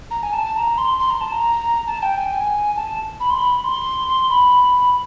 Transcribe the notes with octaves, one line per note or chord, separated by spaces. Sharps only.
A#5
G#5
A5
A5
A#5
C6
C6
A#5
A5
A#5
A5
G5
G#5
G5
G#5
A5
B5
C6
B5
C6
C6
B5